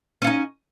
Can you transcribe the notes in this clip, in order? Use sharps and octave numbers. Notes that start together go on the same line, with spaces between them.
C#4 D#4 F4